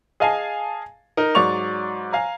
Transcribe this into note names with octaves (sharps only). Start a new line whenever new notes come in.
G#4 D#5 F5 G#5 A5
D#4 A#4
G#2 F#3 D5 C#6 F7
F5 G#5 A#5